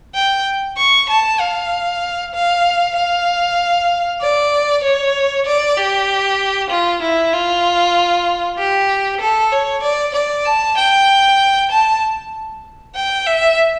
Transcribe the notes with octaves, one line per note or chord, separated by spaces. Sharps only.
G5
C#6
A5
F5
F5
F5
D5
C#5
D5
G4
F4
E4
F4
G4
A4
C#5
D5
D5
A5
G5
A5
G5
E5